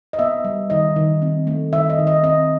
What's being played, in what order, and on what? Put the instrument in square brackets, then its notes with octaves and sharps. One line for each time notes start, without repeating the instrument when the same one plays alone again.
[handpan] D#5
B3 E5
G3
D#3 D#5
D#3
C4
A3
D#3 E5
D#5
D#3
D#5
C4 D#5